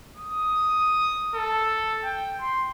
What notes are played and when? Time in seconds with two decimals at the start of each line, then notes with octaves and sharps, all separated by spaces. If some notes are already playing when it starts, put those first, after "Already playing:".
0.17 D#6
1.35 A4
2.04 G5
2.40 C6